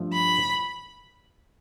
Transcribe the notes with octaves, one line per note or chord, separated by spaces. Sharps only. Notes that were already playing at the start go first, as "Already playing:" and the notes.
Already playing: G2 F3 A3 D4
B5